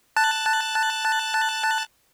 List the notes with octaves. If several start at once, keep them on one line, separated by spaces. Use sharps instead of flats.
A5 F#6 A6